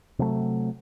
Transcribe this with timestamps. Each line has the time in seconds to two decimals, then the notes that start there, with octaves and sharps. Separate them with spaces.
0.19 C3 F#3 A3